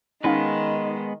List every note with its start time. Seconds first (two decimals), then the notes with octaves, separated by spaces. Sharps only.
0.24 D#3 G#3 B3 C#4 D#4 B4 F5